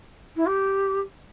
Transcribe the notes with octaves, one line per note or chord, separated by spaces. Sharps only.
E4
G4